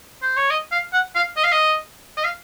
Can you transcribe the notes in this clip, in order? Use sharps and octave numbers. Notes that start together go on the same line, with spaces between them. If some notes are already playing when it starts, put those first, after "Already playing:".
C5
C#5
D#5
F5
F#5
F5
D#5
F5
D#5
D#5
F5